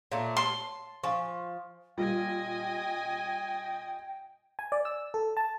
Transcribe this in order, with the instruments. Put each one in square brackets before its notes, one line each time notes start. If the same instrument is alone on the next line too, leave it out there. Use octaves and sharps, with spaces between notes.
[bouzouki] A#2 A3 [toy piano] C#5 F5
[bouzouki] A5 [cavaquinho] C6
[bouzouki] F3 [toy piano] F5 G#5 C#6
[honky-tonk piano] A#2 G3 [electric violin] D#5 G#5 [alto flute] G5
[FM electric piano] G#5
D5
E6
A4
A5